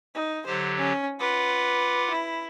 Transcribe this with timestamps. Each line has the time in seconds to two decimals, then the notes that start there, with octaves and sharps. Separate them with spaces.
0.14 D#4
0.47 D3 F#3 G4 C5
0.78 C#4
1.20 F4 B4 F#5 D6
2.10 E4